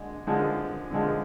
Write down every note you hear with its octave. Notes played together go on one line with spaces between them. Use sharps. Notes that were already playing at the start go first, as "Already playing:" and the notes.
Already playing: D3 G#3
D3 F3 G#3
D3 F3 G#3